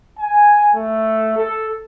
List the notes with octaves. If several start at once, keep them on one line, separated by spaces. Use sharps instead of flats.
G#5
A3
A4